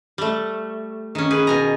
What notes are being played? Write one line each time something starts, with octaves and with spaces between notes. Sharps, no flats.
G3 A3
D#3 C#4
G#4 B4
B2 G#5 A#5